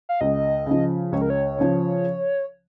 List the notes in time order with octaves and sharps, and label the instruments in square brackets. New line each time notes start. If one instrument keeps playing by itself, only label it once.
[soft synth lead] F5
[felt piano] C#2 [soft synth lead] D#5
[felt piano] C#3 F3
[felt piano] C#2 [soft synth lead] C#5
[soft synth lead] A#4
C#5
[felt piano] C#3 F3